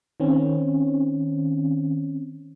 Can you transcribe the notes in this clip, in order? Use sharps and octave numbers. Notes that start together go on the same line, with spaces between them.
D#3 C4 C#4